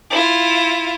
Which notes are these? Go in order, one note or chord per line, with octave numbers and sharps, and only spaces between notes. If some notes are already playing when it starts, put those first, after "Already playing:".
E4 F4